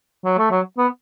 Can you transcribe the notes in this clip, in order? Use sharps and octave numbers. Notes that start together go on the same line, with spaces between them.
F#3
A3
F#3
B3